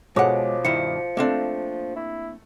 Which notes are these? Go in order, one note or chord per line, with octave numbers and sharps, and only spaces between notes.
B2 F3 G#3 A4 C#5 F#5 D6
G2 D#3 E4 C#7
A3 A#3 C4 D4
E4